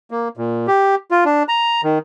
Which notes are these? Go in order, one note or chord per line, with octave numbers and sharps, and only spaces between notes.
A#3
A#2
G4
F4
D4
A#5
D#3